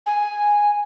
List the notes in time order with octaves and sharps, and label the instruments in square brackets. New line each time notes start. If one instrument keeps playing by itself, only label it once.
[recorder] G#5